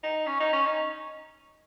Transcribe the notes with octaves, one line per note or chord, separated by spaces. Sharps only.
D#4
C#4
D#4
C#4
D#4